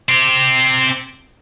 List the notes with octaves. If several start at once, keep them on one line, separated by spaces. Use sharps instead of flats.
C4 G4